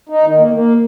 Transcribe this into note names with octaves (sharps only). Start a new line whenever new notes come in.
D#4
D#3
A#3
A#3